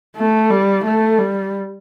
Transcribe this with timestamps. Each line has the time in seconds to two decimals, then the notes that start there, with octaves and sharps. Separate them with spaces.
0.16 A3
0.50 G3
0.84 A3
1.18 G3